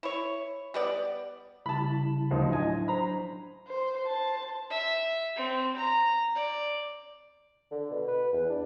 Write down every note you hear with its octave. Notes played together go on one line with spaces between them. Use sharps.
E4 C#5
G3 B3 D5
C#3 G3 E4 A5 B5
D2 F3 D#4
A2 F#3 D4 D#5 G#5
C5 A#5 B5
C5
C5 A5
E5
C4
A#5
D5
D3
B2
B4
E2
D4